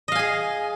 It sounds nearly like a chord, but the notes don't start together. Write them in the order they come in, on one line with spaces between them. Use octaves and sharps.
D#5 F5 G#5 G#4